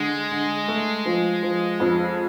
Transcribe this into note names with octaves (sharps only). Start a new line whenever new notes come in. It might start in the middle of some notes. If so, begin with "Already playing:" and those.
Already playing: D3 G#3
D3
A3
F3
F3
F2